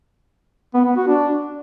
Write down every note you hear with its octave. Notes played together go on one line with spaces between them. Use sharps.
B3
B3
F#4
D4